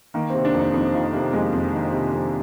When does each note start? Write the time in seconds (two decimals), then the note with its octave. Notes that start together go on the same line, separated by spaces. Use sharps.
0.14 D#3 A#3
0.30 C3 C4
0.45 D4
0.54 F2 D#4
0.74 F2 D#4
0.94 D#3 F4
1.13 C3 A#3
1.33 F2 G#3
1.53 F2
1.73 D#3
1.93 C3
2.13 F2